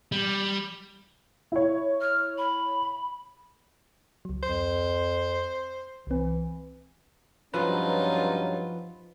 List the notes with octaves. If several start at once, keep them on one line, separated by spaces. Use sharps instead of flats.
G3
E4 C#5
F6
B5
C#2 F#3
F2 C5
C2 E3 C4
G2 F3 F#3 C#4 D#4 F4 B4